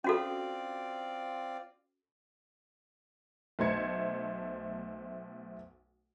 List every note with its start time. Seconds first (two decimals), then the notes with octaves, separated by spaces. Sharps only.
0.04 C4 C#4 F4 F#4 A4 D5
3.59 B1 A3 C5 G#6 C#7